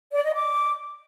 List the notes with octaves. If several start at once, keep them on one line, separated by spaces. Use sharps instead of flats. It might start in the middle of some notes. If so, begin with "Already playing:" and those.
D5
D#5
D6